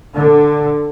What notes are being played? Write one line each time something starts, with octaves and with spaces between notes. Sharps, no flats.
D3